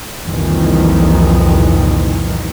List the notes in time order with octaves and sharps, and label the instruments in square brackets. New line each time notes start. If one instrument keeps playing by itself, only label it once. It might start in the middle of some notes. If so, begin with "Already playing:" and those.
[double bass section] C2 F2 A#2 D#3 E3